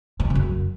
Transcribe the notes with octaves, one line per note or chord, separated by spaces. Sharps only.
A2
C3
C#3
F#2